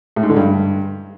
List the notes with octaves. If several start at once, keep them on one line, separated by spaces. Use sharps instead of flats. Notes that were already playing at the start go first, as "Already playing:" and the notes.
A2
G#2
D3
G2